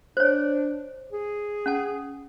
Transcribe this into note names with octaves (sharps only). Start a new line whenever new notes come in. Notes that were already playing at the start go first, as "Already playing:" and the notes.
D4 C5 C#5
G#4
C#4 F#5 A5